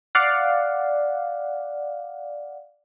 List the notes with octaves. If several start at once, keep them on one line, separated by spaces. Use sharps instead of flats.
D5 F5 F#5